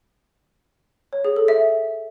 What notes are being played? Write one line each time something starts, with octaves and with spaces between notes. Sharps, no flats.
C#5
G#4
A4
E5